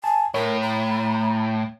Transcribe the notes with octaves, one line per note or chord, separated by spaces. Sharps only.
G#5 A5
A2 A#4 C#5
A#5